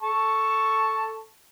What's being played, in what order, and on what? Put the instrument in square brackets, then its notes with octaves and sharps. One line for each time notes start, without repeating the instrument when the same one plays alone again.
[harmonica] A4 A5 C#6